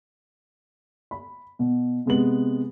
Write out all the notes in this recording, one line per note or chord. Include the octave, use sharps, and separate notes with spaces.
B5
B2
C3 G#3 B3 F#7